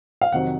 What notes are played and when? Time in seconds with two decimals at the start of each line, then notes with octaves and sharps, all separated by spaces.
0.21 F5
0.32 F2 C3 D#3 F#3 F#5